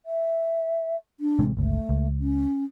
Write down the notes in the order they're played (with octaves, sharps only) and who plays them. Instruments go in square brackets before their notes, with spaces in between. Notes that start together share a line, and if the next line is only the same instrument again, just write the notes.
[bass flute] E5
D4
[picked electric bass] A1 C3 G#3
[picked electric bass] G1 C#2 [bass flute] A3
[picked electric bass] C#2
[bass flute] C#4